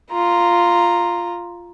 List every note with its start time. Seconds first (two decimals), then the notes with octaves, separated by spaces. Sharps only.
0.12 F4 A#5